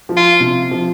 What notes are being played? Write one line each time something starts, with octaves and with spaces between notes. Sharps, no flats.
F3
F4
C3
F3